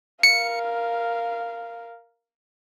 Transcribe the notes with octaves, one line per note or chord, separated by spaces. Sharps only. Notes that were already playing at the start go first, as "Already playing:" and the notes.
A#4 F5 C#7